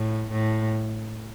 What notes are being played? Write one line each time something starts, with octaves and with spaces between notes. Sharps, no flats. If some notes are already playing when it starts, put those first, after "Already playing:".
Already playing: A2
A2